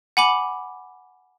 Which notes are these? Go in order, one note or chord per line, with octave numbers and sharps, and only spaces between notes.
F#5 G#5 B5 D6 F#7